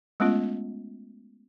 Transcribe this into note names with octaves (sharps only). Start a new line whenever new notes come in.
G#3 A3 B3 C#4 F4